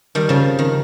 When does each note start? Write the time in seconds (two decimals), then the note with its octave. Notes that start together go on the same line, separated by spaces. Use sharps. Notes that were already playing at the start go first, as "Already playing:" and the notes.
0.15 D#3 G3
0.29 C#3 F3
0.59 D#3